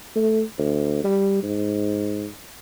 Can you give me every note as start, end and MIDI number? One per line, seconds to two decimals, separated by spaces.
0.16 0.42 57
0.58 1.00 38
1.04 1.38 55
1.43 2.27 44